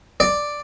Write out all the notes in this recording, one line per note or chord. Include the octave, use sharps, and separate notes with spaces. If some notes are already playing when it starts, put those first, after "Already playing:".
D5